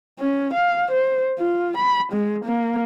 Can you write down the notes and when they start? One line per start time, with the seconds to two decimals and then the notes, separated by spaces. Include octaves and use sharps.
0.19 C#4
0.54 F5
0.92 C5
1.39 F4
1.77 B5
2.13 G#3
2.45 A#3